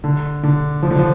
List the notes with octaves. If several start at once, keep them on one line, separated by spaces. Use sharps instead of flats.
D3
D3
F3
D3
F3